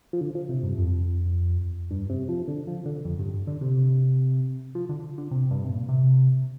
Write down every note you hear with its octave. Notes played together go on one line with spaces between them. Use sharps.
F3
D3
F3
C3
G2
F2
G2
C3
F3
D3
F3
D3
F2
G2
D3
C3
F3
D3
D3
C3
G2
C3
A#2
C3